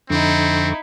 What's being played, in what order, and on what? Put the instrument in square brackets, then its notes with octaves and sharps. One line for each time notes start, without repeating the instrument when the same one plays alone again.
[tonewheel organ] F2 D3 C#6 [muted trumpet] C4 [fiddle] D#4 E4